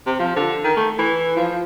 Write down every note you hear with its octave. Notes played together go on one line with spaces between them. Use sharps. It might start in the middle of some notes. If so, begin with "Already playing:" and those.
C3
F3
D3
D#3
A3
E3
F3